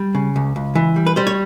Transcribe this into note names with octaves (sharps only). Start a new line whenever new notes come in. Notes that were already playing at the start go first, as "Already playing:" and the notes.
Already playing: G3
C#3
C#2
C#2
E3
G3
B4
G3 C5
C#5